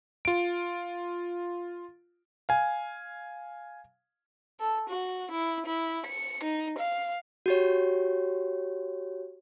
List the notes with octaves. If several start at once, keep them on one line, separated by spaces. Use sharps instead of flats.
F4 D7
F5 G#5
A4
F#4
E4
E4
C#7
D#4
F5
F#4 G4 C#5